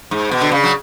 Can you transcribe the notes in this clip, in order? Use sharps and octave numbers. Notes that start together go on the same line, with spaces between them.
G#2
B2
D3
C#3
F#3